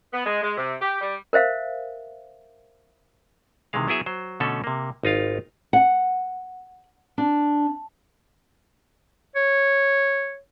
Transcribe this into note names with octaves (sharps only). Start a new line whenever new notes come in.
B3
G#3
G#3
C3
G4
G3
A#4 C5 E5 F5
C3 D#3 E3 G#3 F5
F#3 B3 E4 G#4 E5
F#3 C5
B2 D3 A3 C#4 A4
C3 A#3
G#1 D#4 F4 F5
F#5
D4
C#5